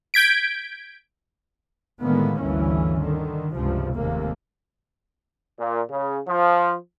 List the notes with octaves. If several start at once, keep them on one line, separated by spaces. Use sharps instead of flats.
G6 G#6 B6 D7
A2 D3 D#3 G#3 A#3 B3
G1 D2 G2 E3 C#4
D3 D#3
C#2 G2 C3 F3
F1 D#2 G#2 C3 A#3
A#2
C#3
F3